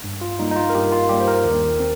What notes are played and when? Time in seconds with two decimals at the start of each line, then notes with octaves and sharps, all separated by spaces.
0.04 G2
0.21 F4
0.39 G3 A#3 D#4
0.51 D#4
0.56 F4
0.70 A#4
0.75 G2 G4
0.92 F4
1.09 G3 A#3 G4
1.20 C5
1.28 A#4
1.44 D#2
1.80 C4